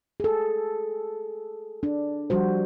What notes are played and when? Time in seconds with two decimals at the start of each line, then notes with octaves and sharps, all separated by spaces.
0.20 G#4 A4
1.83 D4
2.30 F3 G3 F#4 C5